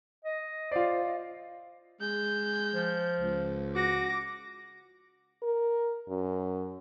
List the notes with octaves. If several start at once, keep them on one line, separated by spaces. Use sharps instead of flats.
D#5
F4 C5 D5
D#5
G#3 G6
F3
C#2
F#4 D6 A#6
A#4
F#2